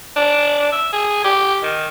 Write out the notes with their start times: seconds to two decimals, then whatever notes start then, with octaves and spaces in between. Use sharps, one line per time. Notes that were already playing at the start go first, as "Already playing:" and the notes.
0.16 D4
0.72 E5
0.93 G#4
1.24 G4
1.63 D#3